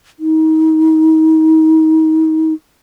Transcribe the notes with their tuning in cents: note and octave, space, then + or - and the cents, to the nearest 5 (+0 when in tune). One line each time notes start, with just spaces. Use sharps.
D#4 +30